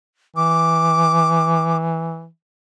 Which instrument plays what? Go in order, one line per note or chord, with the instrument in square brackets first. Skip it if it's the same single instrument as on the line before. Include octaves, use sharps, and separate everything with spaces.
[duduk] E3 [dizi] D6